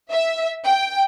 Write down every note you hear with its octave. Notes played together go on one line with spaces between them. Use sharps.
E5
G5